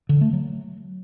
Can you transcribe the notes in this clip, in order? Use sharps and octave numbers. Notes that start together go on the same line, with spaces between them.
D3
A3
F#3